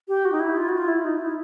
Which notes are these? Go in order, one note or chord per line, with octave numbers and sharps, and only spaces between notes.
G4
F#4
D#4
E4
F4
F#4
F4
E4
D#4
E4